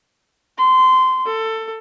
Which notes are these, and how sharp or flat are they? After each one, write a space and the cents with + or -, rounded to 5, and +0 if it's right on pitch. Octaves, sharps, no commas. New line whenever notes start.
C6 -20
A4 +20